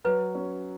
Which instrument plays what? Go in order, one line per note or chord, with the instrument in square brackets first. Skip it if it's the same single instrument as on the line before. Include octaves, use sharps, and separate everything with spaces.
[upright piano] F#3 [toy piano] B4
[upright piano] C#4